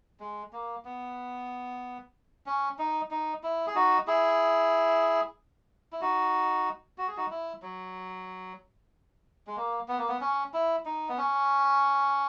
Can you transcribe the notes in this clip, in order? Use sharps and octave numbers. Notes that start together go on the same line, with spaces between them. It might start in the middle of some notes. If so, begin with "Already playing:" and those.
G#3
A#3
B3
C#4
D#4
D#4
E4
G#4
D#4 F#4
E4 G#4
E4
D#4 F#4
F#4
G#4
D#4 F#4
E4
F#3
G#3
A#3
B3
A#3
B3
C#4
E4
D#4
B3
C#4